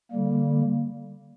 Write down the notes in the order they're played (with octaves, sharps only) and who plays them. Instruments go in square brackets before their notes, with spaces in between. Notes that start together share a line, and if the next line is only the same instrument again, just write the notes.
[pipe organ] D3 G3 A#3